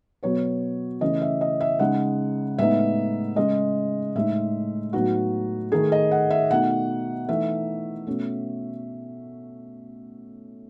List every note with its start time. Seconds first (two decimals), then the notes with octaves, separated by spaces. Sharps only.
0.23 B2 F#3 B3 C#5
1.01 C#3 E3 A3 C#4 D#5
1.22 E5
1.41 D#5
1.61 E5
1.79 C#3 G#3 D#4 F#5
2.58 A2 G#3 B3 D#4 E5
3.36 C#3 G#3 C#4 D#5
4.15 A2 G#3 D#4 E5
4.93 A2 F#3 B3 D#4 F#4
5.72 D#3 A3 D#4 G#4
5.92 D#5
6.11 F#5
6.30 E5
6.50 B2 A3 D#4 F#5
7.29 E3 A3 D#4 E5
8.07 B2 A3 C#4